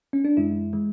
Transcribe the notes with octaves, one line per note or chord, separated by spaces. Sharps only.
C#4
D4
F#2 E3 G#3 E4
E3 G#3